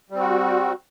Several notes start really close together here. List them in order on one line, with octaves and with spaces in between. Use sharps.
G3 C4 F#4